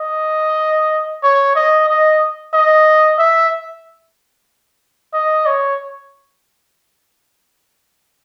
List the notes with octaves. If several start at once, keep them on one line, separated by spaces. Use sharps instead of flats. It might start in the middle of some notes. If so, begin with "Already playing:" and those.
Already playing: D#5
C#5
D#5
D#5
D#5
E5
D#5
C#5